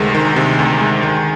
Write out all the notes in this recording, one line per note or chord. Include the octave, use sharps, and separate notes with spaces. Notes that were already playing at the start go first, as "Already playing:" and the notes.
Already playing: D2 C3 D#3 G#3
D#3
C3
D2
G#3
D#3